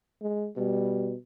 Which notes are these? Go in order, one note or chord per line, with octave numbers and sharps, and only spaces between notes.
G#3
B2 G3